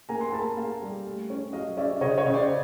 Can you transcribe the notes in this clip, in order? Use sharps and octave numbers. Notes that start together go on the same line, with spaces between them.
A#3 G#5 A#5
A#5 C6
A#3 A5 B5
A#3 F5 G5
G3
A3
C#4
F#3 D#5 F5
C#4 D5 E5
C#3 C#5 D#5
C#5 D#5
C#3
C5 D5